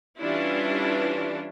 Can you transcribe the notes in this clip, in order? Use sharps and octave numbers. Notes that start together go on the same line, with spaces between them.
E3 G3 C#4 D4 E4 F4